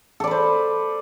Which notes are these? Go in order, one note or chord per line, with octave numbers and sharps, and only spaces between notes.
A4 B4 C5 D5